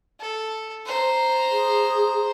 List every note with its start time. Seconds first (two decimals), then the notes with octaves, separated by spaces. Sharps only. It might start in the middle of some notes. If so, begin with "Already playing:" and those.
0.20 A4
0.86 C5 A#5
1.51 G#4